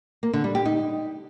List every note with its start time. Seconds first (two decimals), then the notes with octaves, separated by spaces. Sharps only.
0.23 A#3
0.33 D3
0.44 G3
0.55 G4
0.65 D#4